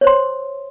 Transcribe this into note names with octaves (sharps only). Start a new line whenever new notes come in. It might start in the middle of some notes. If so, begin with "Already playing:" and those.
C5 C#5 C6